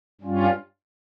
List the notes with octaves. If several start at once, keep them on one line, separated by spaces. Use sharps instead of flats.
G2 G3 C#4 F4